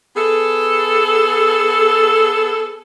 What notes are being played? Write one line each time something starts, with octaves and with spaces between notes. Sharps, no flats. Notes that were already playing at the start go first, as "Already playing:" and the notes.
B3 G#4 A4